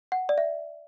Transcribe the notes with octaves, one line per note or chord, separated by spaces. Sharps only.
F#5
D5
E5